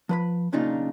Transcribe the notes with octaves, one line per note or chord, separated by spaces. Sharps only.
F3 B4 B5
B1 A#2 C#3 D4 D#4 F4